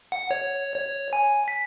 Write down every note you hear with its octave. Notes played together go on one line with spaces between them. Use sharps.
F#5
C#5
C#5
G#5
B6